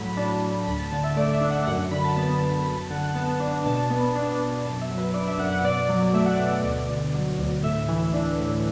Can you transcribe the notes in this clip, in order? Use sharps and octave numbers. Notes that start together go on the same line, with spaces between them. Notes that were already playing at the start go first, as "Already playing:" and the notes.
Already playing: A2 F#3 B5
D4 A5
A2
D2 B5
A5
D3 A5
E5
A3 D5
E5
D4
F#5
F#2 F#5
D3 B5
A5
B3 A5
F#2
F#2 B5
A5
D3 F#5
F#5
B3 A5
D4
B2 A5
B3
D4
B2
F#2 A5
E5
F#3
B4
D4 D5
E5
F#2 F#5
F#5
B2 D5
F#3
A3 E5
F#5
D5
B2 E5
D5
D2
D3
F#3
D2
A2 E5
E3
D4
A2